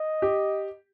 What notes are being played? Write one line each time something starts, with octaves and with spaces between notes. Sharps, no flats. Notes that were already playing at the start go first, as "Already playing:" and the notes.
Already playing: D#5
G4